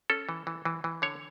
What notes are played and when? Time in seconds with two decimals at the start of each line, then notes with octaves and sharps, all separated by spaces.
0.10 C#4 A4
0.29 E3
0.47 E3
0.65 E3
0.84 E3
1.02 D3 C#5